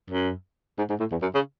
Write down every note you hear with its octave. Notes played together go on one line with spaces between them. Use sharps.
F#2
G#2
G#2
A2
E2
F#2
C#3